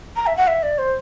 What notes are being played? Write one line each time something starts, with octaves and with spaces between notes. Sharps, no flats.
A#5
E5
F#5
E5
D5
C5